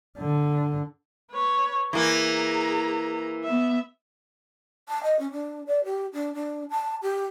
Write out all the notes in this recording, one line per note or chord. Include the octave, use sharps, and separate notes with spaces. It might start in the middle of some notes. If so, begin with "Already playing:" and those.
D3
B4 C#5
E3 A#3 G#4 A#5
B3 E5
A5
D#5
C#4
D4
D5
G4
D4
D4
A5
G4